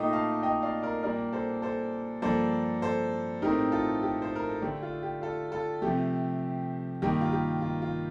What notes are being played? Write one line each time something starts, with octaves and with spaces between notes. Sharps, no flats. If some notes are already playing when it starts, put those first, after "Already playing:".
Already playing: A#2 A3 D#4 D#5 G5
F5 A5
D#5 G5
D5 F5
A#4 D5
A#2 G3 A#3 D4 A#4 D5
A4 C5
A4 C5
G2 F3 A#3 D4 A4 C5
A4 C5
A2 A3 C4 D#4 G4 A#4
F4 A4
G4
C5
A#4
A4
D3 A3 D4 G4
F4
G4
F4 A4
F4 A4
C3 F3 A3 G4
G2 D#3 A#3 G4
F4
G4
F4
F4